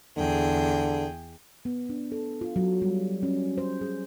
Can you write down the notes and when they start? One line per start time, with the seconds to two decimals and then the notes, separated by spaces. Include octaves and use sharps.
0.17 E2 D3 G#4 G5
1.65 B3
1.89 D4
2.12 A4
2.41 F4
2.56 F#3
2.82 G3
3.23 C#4
3.58 C5
3.81 G#4